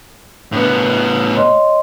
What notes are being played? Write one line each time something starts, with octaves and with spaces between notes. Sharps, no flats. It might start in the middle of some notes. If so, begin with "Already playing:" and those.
A2 B3 D4
C#5 D#5 C6